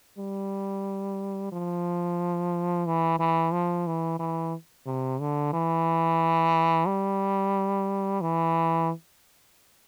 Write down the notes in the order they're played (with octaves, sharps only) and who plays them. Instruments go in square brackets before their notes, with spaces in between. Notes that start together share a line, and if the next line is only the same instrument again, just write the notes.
[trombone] G3
F3
E3
E3
F3
E3
E3
C3
D3
E3
G3
E3